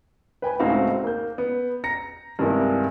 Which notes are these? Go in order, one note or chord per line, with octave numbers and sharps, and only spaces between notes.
B4 G5 G#5 B5
C#2 A2 C4 D#4 F#4 F5
A#3 G6
B3
A#5 A#6 C#7
G2 C3 D#3 G#3 A#3 E4